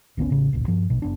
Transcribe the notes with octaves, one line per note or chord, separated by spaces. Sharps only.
G#1 D2 B3 C#4
A1 C#3
D1 A#1
G2 F3
A#1 B2
F#1 F#2 B3 D4